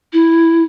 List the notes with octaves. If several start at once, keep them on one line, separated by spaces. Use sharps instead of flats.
E4